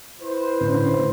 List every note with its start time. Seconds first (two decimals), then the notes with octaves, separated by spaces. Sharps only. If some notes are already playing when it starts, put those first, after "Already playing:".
0.21 E4 B4 C5
0.61 A2 D3 C#4